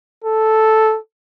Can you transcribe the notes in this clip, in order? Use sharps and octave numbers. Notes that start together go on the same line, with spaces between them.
A4